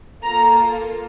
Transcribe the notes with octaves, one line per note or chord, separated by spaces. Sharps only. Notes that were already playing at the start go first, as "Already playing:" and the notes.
A#3 F4 A4 A#5